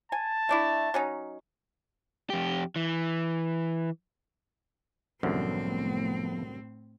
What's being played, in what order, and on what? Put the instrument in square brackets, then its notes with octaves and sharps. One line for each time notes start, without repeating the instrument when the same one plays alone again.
[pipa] G#5 [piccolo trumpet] A5
[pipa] A3 D4 E4
F#3 C#4 D#4
[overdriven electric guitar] F2 G4
E3
[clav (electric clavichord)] C2 F#2 D3 [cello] A2 C4 [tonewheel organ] F3 A3 B3